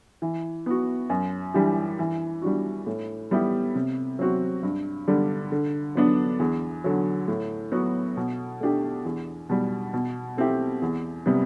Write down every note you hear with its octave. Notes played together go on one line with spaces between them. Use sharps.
E3
B3 F#4
F#2
E3 G3 D4 G4
E3
G3 D4 F#4
A2
G3 B3 E4 G4
C3
F#3 C4 F#4
G2
D3 G3 D4
D3
F#3 B3 D4
E2
D3 F#3
A2
F#3 B3 F#4
B2
A3 D4 G4
E2
B2 G3
B2
A3 C4 E4 G4
E2
C3 G3 B3